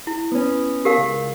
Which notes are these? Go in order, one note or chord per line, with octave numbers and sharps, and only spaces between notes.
E4
B3 C#4
G4 A#4 F5
C#2